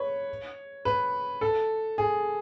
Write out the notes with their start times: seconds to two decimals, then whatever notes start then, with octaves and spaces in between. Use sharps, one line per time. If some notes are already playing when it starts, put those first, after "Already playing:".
Already playing: B4 C#5
0.85 B4
1.41 A4
1.98 G#4